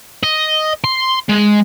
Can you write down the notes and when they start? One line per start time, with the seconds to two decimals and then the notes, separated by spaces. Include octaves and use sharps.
0.23 D#5
0.84 C6
1.29 G#3